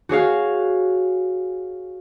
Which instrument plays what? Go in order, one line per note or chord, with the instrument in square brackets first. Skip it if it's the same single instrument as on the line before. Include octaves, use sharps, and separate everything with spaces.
[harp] F#4 G#4 C#5 F5